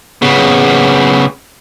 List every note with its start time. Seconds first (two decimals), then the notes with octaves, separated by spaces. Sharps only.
0.22 C#3 B3